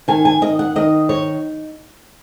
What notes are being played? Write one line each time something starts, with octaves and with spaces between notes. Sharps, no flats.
D#3 G#5
G#5
D#3 D#5
F#5
D#3 D#5
D#4 C#5